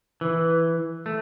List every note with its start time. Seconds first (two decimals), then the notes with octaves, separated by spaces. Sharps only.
0.21 E3
1.06 A3